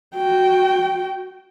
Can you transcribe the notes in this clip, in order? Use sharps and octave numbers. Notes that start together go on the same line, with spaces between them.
F#4 G5